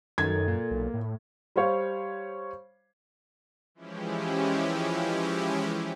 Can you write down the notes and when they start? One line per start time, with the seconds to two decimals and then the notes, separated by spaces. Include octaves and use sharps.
0.18 F#2 D#3 A4 G#6
0.48 A#2
0.71 B1
0.94 A2
1.56 G3 C5 C#5 F5
3.75 E3 F3 G#3 C#4 E4 G4